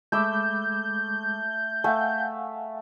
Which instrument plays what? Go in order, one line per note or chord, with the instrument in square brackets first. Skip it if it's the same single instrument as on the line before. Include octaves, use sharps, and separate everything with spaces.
[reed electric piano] G#3 B5 D6 [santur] A3 E6 [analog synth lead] G6
[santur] A3 [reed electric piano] F5 F#5 G#5